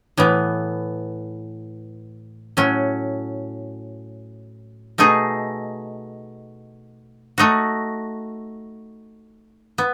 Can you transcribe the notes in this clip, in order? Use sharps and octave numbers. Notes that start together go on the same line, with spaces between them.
A2 E3 B3
A2 F#3 C#4
B2 A3 D#4 G#4
A3 D#4 F#4
B3